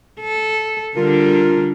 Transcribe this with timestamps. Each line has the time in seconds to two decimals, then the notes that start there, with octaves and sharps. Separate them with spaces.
0.20 A4
0.96 D3 G3 D4 F4 A#4